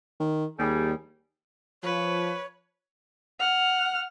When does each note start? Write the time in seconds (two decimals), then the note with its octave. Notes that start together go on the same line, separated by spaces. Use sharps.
0.20 D#3
0.59 D#2 G3 G#4
1.83 F3 B4 C#5
3.39 F#5 F6